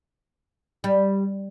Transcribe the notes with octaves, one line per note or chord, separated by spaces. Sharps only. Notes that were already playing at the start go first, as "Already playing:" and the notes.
G3